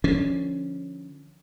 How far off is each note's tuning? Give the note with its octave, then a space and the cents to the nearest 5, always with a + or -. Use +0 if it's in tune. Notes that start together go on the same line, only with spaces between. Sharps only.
D3 +25 F3 +0 C#4 +0